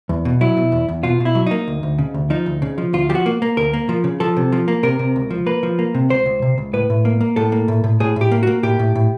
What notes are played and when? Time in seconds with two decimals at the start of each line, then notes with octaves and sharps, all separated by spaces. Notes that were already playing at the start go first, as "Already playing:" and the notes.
0.09 E2
0.25 B2
0.41 F#3 E4
0.57 B2
0.72 E2
0.89 E2
1.03 B2 F4
1.20 B2
1.25 E4
1.35 F#3
1.46 A#3 D#4
1.68 D2
1.83 D2
1.98 C#3
2.14 D2
2.30 F3 D#4
2.46 D2
2.62 C#3
2.78 F3
2.93 D2 F4
3.09 F3 G4
3.15 F#4
3.26 A#3
3.42 A#3
3.57 D2 A#4
3.73 A#3
3.89 F3
4.04 C#3
4.20 F3 A4
4.37 C3
4.52 F3
4.68 A#3
4.83 C3 A#4
4.99 C3
5.16 C#2
5.30 F3
5.46 A#3 B4
5.63 F3
5.79 A#3
5.95 C3
6.10 C#2 C5
6.26 C#2
6.42 C3
6.58 C#2
6.73 A2 B4
6.90 A2
7.05 A#3
7.21 A#3
7.36 A2 A4
7.52 A#3
7.68 A2
7.84 A2
8.00 A2 G#4
8.16 A2 G4
8.31 A#3
8.43 A#3 F#4
8.63 A2 G4
8.79 A2
8.95 A2